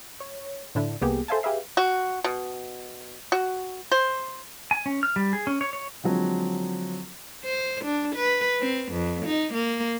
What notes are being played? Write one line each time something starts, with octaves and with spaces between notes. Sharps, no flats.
C#5
A2 D3 D4 E4
C2 A#3 B3 G4 G#4
A4 C5 E5 F5 G#5 A5
G4 G#4 B4 E5 F5
F#4
B2
F#4
C5
G#5
C#4
F6
G3
G#4
C#4
C#5
C#5
D3 F3 F#3 G#3 C4
C5
D4
B4
C4
F2
D#4
A#3